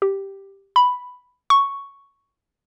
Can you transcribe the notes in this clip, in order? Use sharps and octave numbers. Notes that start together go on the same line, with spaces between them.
G4
B5
C#6